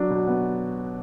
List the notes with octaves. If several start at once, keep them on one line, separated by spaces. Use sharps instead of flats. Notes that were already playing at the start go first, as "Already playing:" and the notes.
Already playing: F#3 D4
B2
B3